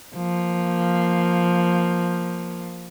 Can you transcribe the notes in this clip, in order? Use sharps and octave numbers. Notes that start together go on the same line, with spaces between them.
F3 A#3